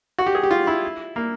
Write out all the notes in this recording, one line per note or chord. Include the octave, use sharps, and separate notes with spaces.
F#4
G4
G#4
G4
F4
E4
A#3